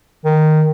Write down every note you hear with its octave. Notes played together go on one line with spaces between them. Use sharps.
D#3